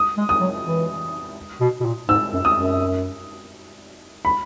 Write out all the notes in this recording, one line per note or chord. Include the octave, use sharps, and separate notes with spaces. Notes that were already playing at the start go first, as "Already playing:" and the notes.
Already playing: D#6
G#3
D#6
F#3
E3
B2
B2
A#2
G#2 E6
F#2
D#6
F#2
B5